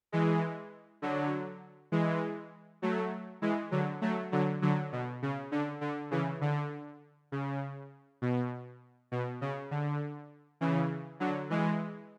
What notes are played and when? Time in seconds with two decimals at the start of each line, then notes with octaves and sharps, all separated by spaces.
0.12 E3 G#3
1.02 D3 F#3
1.92 E3 G#3
2.82 F#3 A3
3.42 E3 G#3
3.71 D3 F#3
4.01 F#3 A3
4.32 D3 F#3
4.62 D3 F#3
4.92 B2
5.22 C#3
5.52 D3
5.81 D3
6.11 C#3 E3
6.41 D3
7.32 C#3
8.22 B2
9.12 B2
9.41 C#3
9.71 D3
10.61 C#3 E3
11.20 D3 F#3
11.50 E3 G#3